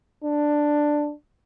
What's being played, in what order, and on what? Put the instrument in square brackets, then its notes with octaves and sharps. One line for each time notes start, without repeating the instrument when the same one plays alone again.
[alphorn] D4